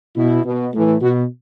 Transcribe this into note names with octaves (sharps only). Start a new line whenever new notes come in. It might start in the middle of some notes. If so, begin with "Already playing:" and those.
B2 E4
B2
A2 E3
B2 F#4